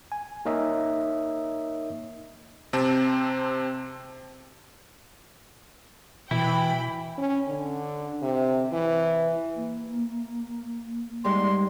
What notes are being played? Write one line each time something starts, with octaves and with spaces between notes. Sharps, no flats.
G#5
A#3 D#4 A#4 C#5 D#5 E5
C3 C4 A5
B2 E3 E4 G5 B5
C#4
D3
C3
E3
A#3
G#2 G3 C6